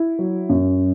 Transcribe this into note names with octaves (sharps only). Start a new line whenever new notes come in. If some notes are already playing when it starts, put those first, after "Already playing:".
Already playing: E4
F#3
F#2